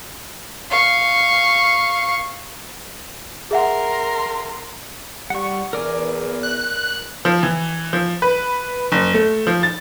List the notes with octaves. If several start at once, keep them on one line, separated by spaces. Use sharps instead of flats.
F5 C#6
G#4 A#4 E5 F#5 C6
G3 F#5 C#6
E2 A#4 D5 G#5
F#6
F3
E3
F3
B4
F#1
A3
F3
A6